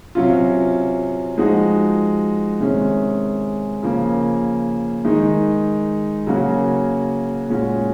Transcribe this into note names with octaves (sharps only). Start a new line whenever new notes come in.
C3 F#3 C#4 F4
F3 G#3 D#4 F#4
C3 D#3 G#3 C#4
C#3 F3 A#3 C#4
D#3 G#3 D#4
C#3 F#3 A#3 C#4 F#4
A#2 G#3 C#4 F#4